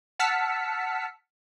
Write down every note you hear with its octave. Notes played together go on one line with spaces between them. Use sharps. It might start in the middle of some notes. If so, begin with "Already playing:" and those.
F#5 A5 E6 F6 B6 C#7